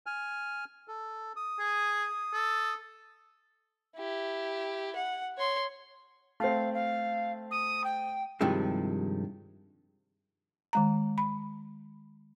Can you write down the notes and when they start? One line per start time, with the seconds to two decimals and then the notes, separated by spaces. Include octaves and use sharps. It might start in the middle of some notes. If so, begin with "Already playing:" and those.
0.06 G#5 F6
0.88 A4
1.36 D#6
1.59 G#4
2.33 A4
3.96 E4 G4
4.96 F#5
5.38 C#5 C6
6.40 A3 C4 F5
6.74 F5
7.51 D#6
7.84 G5
8.41 G2 C3 D#3 F3 G#3 E4
10.73 D#3 G#3 A#5
11.18 B5